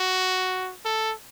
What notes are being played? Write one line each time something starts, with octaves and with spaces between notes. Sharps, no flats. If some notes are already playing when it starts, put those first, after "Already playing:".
Already playing: F#4
A4